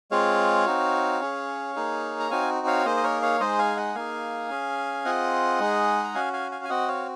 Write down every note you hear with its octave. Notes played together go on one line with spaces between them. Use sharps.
G#3 C4 F4 G#4 C#5 F5
C4 D#4 F#4
C#4 G#4
A#3 D#4 G#4
A#5
C4 D#4 F#4 F5 G#5
C#5 F5
A#3 D#4 G#4 C5 D#5
D#5
A#4 C#5
C#5 F5
G#3 D#4 G#4 C5 D#5
F5 G#5
D#5 F#5
A#3 D#4 G#4 F5 G#5
C#4 G#4
C4 F4 G#4 D#5 F#5
G#3 D#4 G#4
A#5
C#4 F#4 F5 G#5
F5 G#5
F5 G#5
G#5
C4 F#4 D#5 F#5
C#5 F5